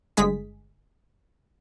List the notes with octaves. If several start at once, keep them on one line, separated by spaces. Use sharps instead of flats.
G1 G#3 G#4 B6